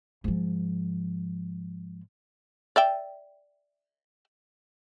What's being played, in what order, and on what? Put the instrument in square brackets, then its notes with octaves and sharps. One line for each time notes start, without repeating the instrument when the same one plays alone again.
[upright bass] G#2 F3
[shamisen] D5 E5 G5